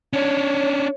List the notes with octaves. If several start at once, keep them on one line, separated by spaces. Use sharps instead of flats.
C#4 D4 C#5